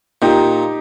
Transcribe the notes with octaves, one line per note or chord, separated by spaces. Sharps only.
A#2 D#4 G4